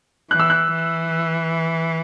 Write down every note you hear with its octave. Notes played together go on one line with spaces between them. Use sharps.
E3 F#6
E6
F#6
E3